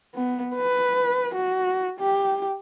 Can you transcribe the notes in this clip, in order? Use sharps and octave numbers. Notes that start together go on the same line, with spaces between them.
B3
B4
F#4
G4